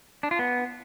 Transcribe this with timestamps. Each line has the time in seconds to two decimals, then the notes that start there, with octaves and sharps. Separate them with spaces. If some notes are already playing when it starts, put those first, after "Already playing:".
0.23 D4
0.31 F4
0.39 B3